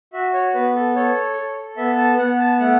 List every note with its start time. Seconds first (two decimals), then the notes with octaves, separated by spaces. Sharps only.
0.13 F#4 E5
0.34 C#5
0.54 B3 B4
0.75 A4
0.95 A4 C#5
1.36 A4
1.77 B3 E5
1.98 A5
2.18 B3 F#5
2.39 A5
2.59 A3 F#5